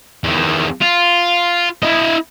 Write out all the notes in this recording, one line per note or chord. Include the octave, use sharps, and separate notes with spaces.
E2 D#3
F4
E4 D#5